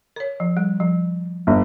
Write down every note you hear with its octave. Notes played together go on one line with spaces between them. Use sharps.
A#4 C#5
F3
G3
F3
G1